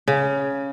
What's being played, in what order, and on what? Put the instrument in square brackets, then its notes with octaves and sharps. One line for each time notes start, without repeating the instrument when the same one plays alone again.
[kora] C#3